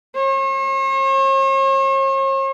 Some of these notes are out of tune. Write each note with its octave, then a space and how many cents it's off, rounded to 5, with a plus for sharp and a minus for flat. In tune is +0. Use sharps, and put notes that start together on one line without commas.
C#5 -45